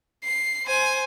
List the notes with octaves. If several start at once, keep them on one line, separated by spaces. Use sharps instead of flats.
C7
C5 G#5